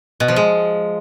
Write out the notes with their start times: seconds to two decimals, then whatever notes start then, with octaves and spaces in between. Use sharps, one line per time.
0.20 B2
0.28 F3
0.36 G#3